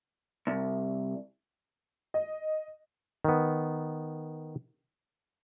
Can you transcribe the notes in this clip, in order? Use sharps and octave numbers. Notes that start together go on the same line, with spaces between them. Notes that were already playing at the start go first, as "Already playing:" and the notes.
C2
D#5
D#3 B3